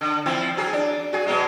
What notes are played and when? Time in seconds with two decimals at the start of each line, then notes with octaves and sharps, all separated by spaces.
0.01 D3
0.26 F3 C4 E4
0.57 F#3 G#4
0.73 D4
1.13 F#4 G#4
1.26 B2 F#3 G#3